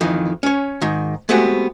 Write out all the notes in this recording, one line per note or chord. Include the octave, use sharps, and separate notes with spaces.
F2 D#3 E3
C#4 C#5
G#2 D#3
G#3 A3 B3 C4 F#4 G4